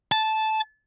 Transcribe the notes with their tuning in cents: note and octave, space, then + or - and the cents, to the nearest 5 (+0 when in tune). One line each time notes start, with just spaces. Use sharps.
A5 -10